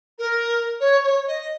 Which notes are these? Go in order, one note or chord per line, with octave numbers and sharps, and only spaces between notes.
A#4
C#5
C#5
D#5